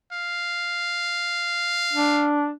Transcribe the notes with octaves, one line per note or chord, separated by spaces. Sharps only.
F5
D4